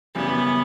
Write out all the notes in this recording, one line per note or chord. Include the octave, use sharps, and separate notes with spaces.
F#2 C#3 E3 G3 B3